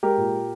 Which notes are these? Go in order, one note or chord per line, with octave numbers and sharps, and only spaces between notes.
G#3 G4 A#4
A#2